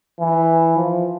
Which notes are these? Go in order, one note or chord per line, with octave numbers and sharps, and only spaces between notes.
E3
F3